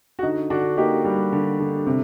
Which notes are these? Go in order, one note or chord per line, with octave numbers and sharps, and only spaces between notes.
F#4
D3 D#4
D3 D4 F#4
A#3 D#4 G4
G3
D3
D3
C3